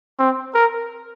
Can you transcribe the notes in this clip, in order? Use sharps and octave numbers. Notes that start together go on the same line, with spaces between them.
C4
A#4